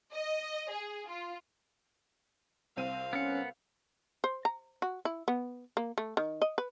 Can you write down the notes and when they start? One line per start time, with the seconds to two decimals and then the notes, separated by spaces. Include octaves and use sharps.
0.14 D#5
0.70 G#4
1.09 F4
2.77 C2 C4 F5 D#7
3.13 B3 C#4 A#4 F#5
4.24 C5
4.45 A#5
4.82 F#4
5.05 E4
5.28 B3
5.77 A#3
5.98 A3
6.17 D#3
6.42 D#5
6.58 B4